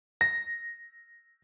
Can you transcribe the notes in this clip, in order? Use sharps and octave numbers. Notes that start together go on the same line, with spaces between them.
A#6